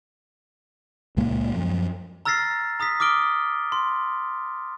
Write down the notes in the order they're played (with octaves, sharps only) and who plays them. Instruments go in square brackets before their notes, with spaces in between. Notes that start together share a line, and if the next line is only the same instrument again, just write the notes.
[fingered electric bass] C#2 A#2 G#3 A#3
F#2 F3
[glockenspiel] A#5 E6 F6 A6 A#6 C7
A#5 D#6 A#6 B6
D6 D#6 F6 D7 G7
C6